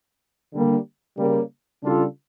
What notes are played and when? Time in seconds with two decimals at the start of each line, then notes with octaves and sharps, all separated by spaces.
0.54 D3 G3 A#3
1.18 C#3 G3 A#3
1.82 C#3 G3 D4 F4 A4